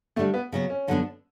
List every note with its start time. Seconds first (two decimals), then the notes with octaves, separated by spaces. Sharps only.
0.16 D3 G3 A3 D4
0.34 B3
0.52 C#3 F#3 B3 F#4
0.70 C#4
0.88 F#2 D3 F#3 B3 D4